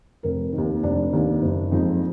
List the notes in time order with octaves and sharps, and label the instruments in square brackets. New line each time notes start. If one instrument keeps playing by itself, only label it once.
[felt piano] F1 A#4
D#3
D#2
F1 D4 D5
D#2 D#3
F#1
F2 F3 G#3 D#4